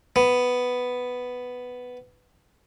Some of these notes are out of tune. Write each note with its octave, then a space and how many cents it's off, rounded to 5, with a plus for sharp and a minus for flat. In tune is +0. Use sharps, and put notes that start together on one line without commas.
B3 +5